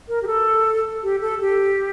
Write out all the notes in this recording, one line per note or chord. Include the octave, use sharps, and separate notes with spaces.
A#4
G4
A4
G4
A4
G4